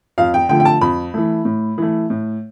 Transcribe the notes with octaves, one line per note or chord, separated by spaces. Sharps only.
F2 F5
G5
D3 F3 A3 G5
G5
A5
F2 B5
E3 A3
A2
E3 A3
A2